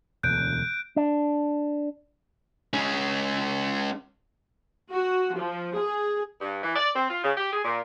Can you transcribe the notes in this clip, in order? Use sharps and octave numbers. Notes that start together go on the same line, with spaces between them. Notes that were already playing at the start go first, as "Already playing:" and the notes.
E1 D2 F#6 G6 D7
D4
G#3 C#4
F#4
F3
G#4
G2
E3
D5
C4
F4
C#3
G4
G#4
A#2